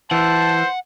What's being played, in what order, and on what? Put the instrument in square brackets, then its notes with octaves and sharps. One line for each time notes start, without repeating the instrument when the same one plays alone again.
[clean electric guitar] E3 [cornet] C5 [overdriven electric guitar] F#5 [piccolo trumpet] A5